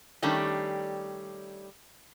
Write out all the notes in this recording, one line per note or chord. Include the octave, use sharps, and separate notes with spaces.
D#3 G3 A3 C#4 D4 G4